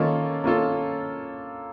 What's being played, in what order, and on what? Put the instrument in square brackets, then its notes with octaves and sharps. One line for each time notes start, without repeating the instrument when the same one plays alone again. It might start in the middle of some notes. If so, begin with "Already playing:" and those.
Already playing: [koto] D#3 [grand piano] A#3 C#4 F4 A4
[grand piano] A#3 C#4 F4 A4